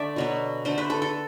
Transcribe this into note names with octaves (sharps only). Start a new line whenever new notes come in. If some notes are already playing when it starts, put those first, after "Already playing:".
Already playing: D3 A3 D5 E5
B2 F#3 B3
D3 A3 C5
B4
A4
A4